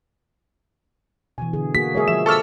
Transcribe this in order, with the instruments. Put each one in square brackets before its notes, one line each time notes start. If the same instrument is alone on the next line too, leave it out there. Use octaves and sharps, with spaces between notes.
[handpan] B2 E3 [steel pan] G#5
[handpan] D3 G#4
[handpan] A#3 F#4 G#4 [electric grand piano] B6
[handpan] G#3 E5 [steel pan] G#4 A#4 C#5
[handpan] F3 [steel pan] E5 [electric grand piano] E7
[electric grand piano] A4 C#6 F6 [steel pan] A5 D6 E6